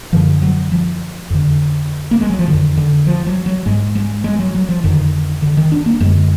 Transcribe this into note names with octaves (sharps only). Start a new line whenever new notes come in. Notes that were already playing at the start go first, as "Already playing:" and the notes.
F#2 D3 F3
F#3
F3
F2 D3
A#3
G#3
F#3
F3
F2 D3 D#3
D3
F3
F#3
F#3
G#2 G#3
G#3
G#3
F#3
F#3
F3
F2 D3 D#3
D3
D#3
D4
A#3
F#2 D3 G#3